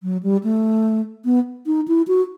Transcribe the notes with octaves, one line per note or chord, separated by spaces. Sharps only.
F#3
G3
A3
B3
D#4
E4
F#4